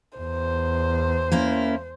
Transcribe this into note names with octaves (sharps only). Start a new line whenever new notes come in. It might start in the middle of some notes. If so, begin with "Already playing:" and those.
E2 C5
A#3 C#4 E4